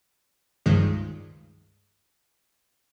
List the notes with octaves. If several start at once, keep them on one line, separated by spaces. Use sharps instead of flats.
C#2 G2 D#3 F3 G#3